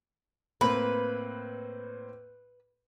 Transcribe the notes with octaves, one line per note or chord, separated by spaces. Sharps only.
A2 A#3 C4 B4